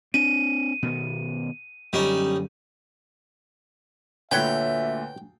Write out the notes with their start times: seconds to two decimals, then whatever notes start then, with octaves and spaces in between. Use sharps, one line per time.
0.14 C4 D4 D#7
0.82 B2 D#3 B3
1.93 F#2 D3 G3 C#4 D#4
4.31 D2 A#2 D3 B4 C#5 E5 G5